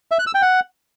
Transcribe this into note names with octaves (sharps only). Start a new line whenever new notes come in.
E5
F#6
E6
G5
F#5